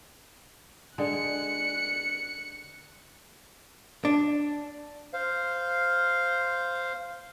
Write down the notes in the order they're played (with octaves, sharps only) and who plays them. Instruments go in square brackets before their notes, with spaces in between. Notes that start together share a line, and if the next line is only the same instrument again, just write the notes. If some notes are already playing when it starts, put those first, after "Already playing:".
[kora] D3 G#3 [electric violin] F#6 C#7
[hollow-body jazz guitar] D4
[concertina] C5 F5